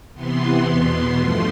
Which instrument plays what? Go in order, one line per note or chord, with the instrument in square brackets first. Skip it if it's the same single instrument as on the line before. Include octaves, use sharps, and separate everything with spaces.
[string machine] C3 E3 B3 C6
E2 B2 B3
G2 F3 A3 C6